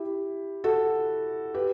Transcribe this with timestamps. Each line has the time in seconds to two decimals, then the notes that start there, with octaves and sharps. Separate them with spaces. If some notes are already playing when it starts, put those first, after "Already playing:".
Already playing: E4 G4
0.64 F#4 A4
1.54 G4 B4